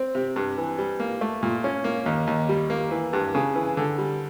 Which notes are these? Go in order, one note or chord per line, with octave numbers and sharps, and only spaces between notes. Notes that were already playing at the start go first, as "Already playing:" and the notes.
Already playing: C4
C3
G2
E3
G3
A#3
A3
A#2
C#4
A#3
D#2
D#2
G3
A#3
E3
G2
C#3
E3
D3
G3